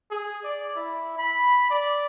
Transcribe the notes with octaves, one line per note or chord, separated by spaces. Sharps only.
G#4
D5
E4
B5
D5